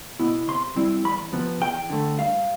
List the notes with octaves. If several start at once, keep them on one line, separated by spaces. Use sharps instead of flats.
B2 B3 E4
C3 C6
G3 C4 E4
E2 B5
C3 F3 B3
E2 G5
D3 A3
G2 F5